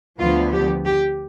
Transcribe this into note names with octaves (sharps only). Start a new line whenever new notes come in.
D2 D3 F3 B3 F4
G4
G4